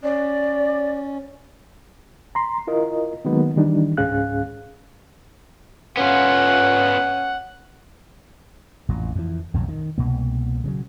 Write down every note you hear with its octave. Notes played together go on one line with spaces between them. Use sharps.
C#4 D5
A#5 C6
E4 F4 A#4 D#5
D#3 F#3 G#3 A#3 B3 D#4
D#3 E3 G3 D4 D#4
C#2 G#2 C#4 G#4 F5 F#6
B3 C#4 F4 F#5
A1 F2 A#2
F2 E3
B1 F2 G#2 C#3
D#3
C2 B2 A#3
C#3 E3 F#3